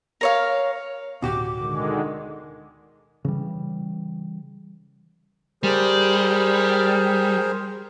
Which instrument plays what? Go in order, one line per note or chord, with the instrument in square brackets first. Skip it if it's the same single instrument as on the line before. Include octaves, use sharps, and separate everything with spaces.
[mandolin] A#4 C#5 F5
[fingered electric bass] D1 [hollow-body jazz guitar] B2 F#4 G4 [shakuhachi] D6
[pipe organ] D3 D#3 G#3
[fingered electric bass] C#3 E3 G3
[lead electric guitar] G3 [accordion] G#4 A#4 C5